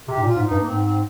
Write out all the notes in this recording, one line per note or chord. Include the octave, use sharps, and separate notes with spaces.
C3 G4
G#2
A#2
F4
G#2
G2 D#4
A#3
G#2 C4
C4